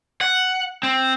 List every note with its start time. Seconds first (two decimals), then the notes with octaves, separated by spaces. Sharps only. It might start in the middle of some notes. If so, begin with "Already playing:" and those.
0.21 F#5
0.83 C4